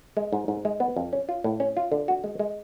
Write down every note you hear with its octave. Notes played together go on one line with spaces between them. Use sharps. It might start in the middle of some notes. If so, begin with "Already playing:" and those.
G#3
G#2
G#2
G#3
B3
F2
C#4
F4
A2
C#4
F4
D3
F#4
G#3
G#3